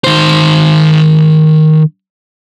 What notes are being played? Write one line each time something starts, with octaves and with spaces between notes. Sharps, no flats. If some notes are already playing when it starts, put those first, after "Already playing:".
D#3 C5